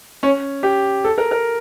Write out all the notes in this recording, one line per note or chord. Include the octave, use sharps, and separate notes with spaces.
C#4
G4
A4
A#4
A#4